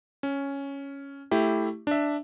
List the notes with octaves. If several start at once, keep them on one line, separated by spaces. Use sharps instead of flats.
C#4
A3 E4 G4
D4 E5